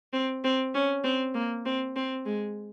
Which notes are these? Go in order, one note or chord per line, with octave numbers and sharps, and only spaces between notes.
C4
C4
C#4
C4
A#3
C4
C4
G#3